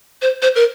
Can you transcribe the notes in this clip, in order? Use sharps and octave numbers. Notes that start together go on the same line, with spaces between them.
C5
C5
A#4